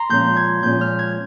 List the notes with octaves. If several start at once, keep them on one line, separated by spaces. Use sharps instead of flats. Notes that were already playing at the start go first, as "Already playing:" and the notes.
Already playing: A#5 C6
A#2 F3 G#3 C#4 G6
G#6
A#2 F3 G#3 C#4 G6
F6
G#6